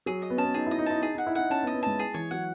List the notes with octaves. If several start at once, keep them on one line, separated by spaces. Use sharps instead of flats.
F#3 G#4
D#5
B3
C#4 A5
B3
D#4 G#4
E4 D#5
D#4
E4 A5
D#4 G#4
D#4 F#5
E4
D#4 F#5
C#4 A5
B3
D#5
B3
G#3 A5
G#4
E3 C#5
F#3 F#5